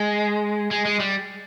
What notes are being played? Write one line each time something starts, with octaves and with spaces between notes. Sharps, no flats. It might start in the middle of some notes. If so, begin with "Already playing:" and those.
Already playing: G#3
G#3
G#3
G3